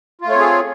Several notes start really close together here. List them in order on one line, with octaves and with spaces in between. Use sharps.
F4 A3 C#5 C4 G#4